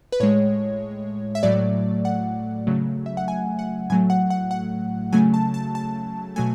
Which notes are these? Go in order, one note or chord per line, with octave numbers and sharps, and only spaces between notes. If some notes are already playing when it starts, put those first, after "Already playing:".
B4
A2 G#3 C#5
E5
A2 F#3 A3 D5
F#5
C#3 F#3 A3
E5
F#5
G#5
F#5
A2 F#3 A3 G#5
F#5
F#5
F#5
C#3 F#3 A3 G#5
A5
A5
A5
B2 F#3 A3 G#5